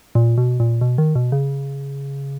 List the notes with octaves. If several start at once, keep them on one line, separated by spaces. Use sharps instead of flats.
A#2
B2
A#2
B2
D#3
B2
C#3